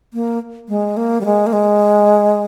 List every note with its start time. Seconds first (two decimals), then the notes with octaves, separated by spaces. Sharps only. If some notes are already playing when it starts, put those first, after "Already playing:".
0.14 A#3
0.69 G#3
0.97 A#3
1.21 G3
1.25 G#3
1.47 A#3
1.53 G#3